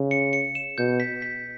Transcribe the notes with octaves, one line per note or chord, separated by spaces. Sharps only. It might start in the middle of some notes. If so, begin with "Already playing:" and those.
Already playing: C#3
C#7
C#7
E7
B2 G6
B6
B6